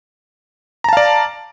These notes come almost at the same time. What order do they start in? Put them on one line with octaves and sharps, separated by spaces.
A#5 A5 F5 D5